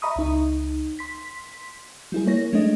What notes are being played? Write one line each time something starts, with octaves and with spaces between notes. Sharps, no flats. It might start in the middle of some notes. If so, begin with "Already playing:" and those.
D#5 E5 A#5 B5 C#6 D#6
C#2 D#4
C6 B6
G3 E4 G#4
A#3 C#5 A#6
G#3 A3 D4 D#5